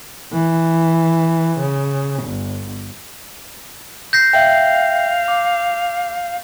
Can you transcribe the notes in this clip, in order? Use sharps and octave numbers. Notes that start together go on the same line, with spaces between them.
E3
C#3
G1
G6 A#6 C7
E5 F5 G5
D6